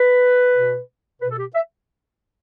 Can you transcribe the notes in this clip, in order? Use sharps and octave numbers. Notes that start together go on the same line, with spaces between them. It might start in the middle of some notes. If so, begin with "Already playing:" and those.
Already playing: B4
B2
B2 B4
A4
G4
E5